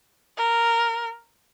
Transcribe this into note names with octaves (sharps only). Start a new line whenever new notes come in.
A#4